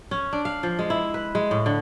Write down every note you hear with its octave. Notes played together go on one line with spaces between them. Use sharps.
C#4
D4
F5
F3
G#3
E4
B4
G#3
A2
D3